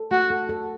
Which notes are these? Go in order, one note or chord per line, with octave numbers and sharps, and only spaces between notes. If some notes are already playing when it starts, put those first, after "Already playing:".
Already playing: A4
A3 F#4
A4
A4